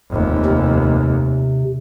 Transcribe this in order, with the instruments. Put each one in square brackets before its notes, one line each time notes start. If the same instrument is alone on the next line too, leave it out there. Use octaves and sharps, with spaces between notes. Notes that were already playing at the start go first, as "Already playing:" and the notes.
[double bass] F1 D#2
[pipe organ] C3